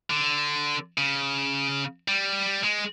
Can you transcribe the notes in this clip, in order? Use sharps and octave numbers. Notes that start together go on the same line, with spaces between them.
D3
C#3
G3
G#3